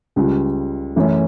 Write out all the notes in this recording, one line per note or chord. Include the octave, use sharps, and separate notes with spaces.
C#2 C#3 G3
F#2 E3 A3 C#4